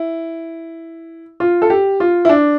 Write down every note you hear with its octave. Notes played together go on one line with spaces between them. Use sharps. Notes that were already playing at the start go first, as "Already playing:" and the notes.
Already playing: E4
F4
A4
G4
F4
E4
D4